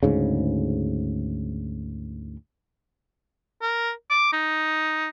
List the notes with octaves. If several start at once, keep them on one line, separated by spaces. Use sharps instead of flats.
D2 G#2 C#3
A#4
D6
D#4